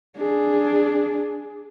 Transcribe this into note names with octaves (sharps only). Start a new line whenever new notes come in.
D4 G#4